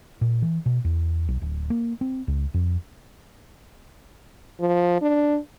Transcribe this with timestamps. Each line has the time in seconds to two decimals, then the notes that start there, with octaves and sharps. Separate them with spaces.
0.21 A#2
0.42 E3
0.66 B2
0.84 E2
1.28 B1
1.41 D1
1.70 A#3
2.01 C4
2.28 C#2
2.54 F2
4.60 F3
5.02 D4